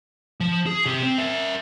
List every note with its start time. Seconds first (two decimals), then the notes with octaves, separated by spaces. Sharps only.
0.40 F3
0.66 G#4
0.85 C3 G4
1.03 C4
1.18 A#4 E5